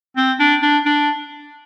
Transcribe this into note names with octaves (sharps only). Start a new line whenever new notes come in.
C4
D4
D4
D4